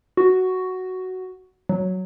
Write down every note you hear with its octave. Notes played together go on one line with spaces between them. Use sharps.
F#4
F#3